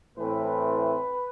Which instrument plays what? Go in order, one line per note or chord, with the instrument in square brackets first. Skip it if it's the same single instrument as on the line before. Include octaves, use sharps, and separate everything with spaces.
[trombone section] A2 E3 A3 C4 B4